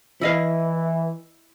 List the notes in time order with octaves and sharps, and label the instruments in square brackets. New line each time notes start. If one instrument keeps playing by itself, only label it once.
[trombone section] E3 [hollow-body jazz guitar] E4 D#5 F5